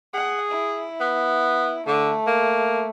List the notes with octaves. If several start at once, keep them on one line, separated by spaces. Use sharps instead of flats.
G#4 F#5
E4
B3
D3 A3
A#3